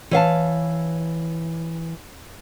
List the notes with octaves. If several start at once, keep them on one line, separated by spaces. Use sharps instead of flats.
E3 C#5 F5 A5